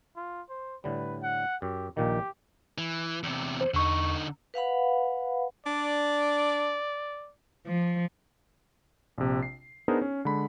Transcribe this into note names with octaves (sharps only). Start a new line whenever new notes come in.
F4
C5
A2 D3 G3 B4
F#5
F#2 G4
A#1 A#2 D#3 G4
E3
E2 C3
C5
E2 D3 D#4 C#6
B4 F5 F#5 B5
D4 D5
F3
A#1 C3
C7
B3 D4 D#4 G#4 A#4 C5
C#4
D3 G#3 B5